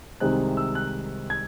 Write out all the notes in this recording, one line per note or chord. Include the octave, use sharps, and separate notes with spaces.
C2 C3 D#3 G#3 C4 F#6
E6
F#6
G#6